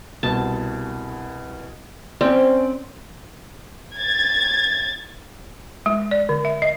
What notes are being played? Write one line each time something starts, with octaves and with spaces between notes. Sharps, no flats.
C2 B2 A5
C4 C#4 D5
G#6 A6
G#3
D5
D3
E5
D#5